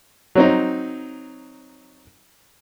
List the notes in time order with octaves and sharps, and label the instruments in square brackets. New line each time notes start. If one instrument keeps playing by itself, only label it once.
[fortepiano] F#3 C4 D#4